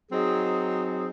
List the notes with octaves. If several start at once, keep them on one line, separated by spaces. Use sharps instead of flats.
F#3 C4 D#4 G#4